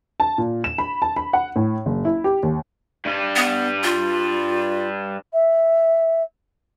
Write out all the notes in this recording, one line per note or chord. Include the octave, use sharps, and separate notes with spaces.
A5
A#2
E7
B5
A5
B5
F#5
A2
F#1
E4
G4
D#2
G2 G3
B3
F4
E5